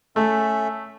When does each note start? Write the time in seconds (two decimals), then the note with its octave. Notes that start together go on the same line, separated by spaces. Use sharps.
0.16 A3 C#4 A4 E5